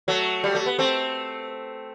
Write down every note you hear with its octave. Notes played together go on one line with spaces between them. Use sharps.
F#3 A3
G3
A3
B3
A3 C4